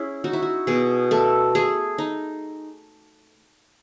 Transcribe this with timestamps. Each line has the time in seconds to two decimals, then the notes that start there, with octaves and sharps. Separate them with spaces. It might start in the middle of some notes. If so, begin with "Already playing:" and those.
Already playing: C#4 E4 G#4
0.24 D#4 F#4
0.33 E4
0.43 F#4
0.67 B2 G#4
1.11 A3 A4
1.55 A3 G#4
1.98 D#4